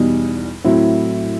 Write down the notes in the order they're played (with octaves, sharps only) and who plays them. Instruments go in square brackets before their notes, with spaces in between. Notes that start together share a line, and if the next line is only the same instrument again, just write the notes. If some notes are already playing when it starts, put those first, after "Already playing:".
Already playing: [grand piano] E2 B2 G3 D#4
A2 F#3 C4 E4